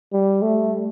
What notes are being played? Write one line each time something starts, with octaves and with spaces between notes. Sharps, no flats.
G3
A3